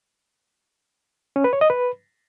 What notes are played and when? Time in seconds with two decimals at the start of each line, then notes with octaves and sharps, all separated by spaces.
1.36 C#4
1.44 B4
1.53 C#5
1.61 D#5
1.70 B4